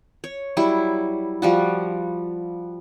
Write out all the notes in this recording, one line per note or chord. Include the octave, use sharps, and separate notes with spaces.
C#5
F#3 G3 E4
F3 G3 F#4